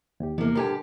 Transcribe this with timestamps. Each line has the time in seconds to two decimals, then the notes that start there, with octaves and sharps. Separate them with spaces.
0.20 D#2 G4
0.38 E2 C3 A#3
0.55 G2 D3 G4 A#4 G#5